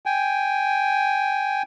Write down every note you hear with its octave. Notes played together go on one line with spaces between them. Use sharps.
G5 G#5